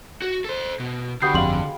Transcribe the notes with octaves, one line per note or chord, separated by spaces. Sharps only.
F#4
A4 C5
B2
D3 G3 B3 F#4 D#6 G6 C7
G1 F2 G#3 F5 G5 C6 F#7